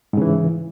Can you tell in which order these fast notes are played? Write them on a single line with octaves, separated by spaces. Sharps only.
G#2 C#3 E3